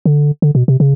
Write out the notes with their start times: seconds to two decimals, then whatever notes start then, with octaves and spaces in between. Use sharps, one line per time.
0.06 D3
0.42 D3
0.55 B2
0.68 C3
0.80 C#3